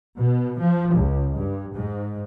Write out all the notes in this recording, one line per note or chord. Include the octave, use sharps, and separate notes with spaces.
B2
F3
C#2
G2
G#2